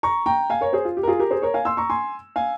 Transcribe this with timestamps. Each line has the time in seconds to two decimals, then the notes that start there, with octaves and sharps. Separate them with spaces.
0.03 A#5 C#6
0.26 G5 A#5
0.50 F5 G#5
0.61 A#4 C#5
0.73 G#4 C5
0.85 F4
0.97 G4
1.03 A#4
1.08 F4 G#4
1.19 G4 A#4
1.31 G#4 C5
1.42 A#4 C#5
1.54 F5 G#5
1.65 C6 E6
1.77 A#5 C#6
1.90 G#5 C6
2.36 F5 G#5